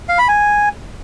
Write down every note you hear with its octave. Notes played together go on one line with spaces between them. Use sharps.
F5
B5
G#5